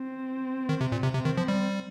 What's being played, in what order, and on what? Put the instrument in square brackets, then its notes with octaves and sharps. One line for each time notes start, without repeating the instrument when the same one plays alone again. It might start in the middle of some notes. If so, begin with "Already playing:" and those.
Already playing: [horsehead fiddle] C4
[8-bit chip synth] D#3
C3
A#2
C3
[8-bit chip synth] C3 [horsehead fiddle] C4
[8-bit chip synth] D#3
F3
G3